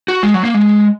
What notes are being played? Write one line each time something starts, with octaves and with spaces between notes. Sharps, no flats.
F#4
G#3
F#3
A#3
G#3